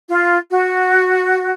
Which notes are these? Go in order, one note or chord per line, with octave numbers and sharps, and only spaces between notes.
F4
F#4